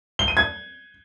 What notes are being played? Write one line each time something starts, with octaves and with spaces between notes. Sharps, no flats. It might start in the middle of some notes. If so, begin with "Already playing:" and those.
G7
D#7
G#6